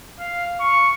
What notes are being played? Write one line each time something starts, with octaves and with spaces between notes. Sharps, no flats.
F5
C#6